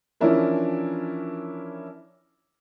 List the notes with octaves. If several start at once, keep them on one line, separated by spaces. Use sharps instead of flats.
E3 F3 C#4 D4 E4 A#4